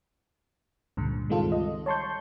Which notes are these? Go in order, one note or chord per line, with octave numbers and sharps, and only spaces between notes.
C#2 G2 A#2 D3
D#3 G3 G#3 C4 F4 A4
D#5
C#5 A5 C6 C#6 G6